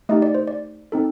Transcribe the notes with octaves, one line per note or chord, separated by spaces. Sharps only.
A3 D#4 G4 D#5
D5
C5
D5
C4 D#4 A4